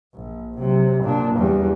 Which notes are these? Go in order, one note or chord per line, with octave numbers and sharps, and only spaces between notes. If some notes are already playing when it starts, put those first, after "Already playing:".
A#1
C3 F#3
A#2 D4
E2 G3